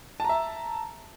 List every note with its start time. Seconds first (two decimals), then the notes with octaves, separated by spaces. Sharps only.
0.20 A5
0.25 A#5
0.29 E5